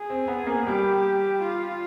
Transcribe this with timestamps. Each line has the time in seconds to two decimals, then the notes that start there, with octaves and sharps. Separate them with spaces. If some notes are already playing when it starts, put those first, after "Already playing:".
Already playing: G#4
0.10 C4
0.28 B3
0.47 A#3
0.66 G3 G4
1.41 F4